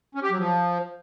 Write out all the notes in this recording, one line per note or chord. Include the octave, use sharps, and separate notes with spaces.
C#4
G4
F#3
F3